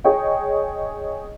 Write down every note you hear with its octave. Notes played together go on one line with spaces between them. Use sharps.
G#4 C#5 D#5 G5